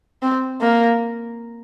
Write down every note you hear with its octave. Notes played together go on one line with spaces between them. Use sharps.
C4
A#3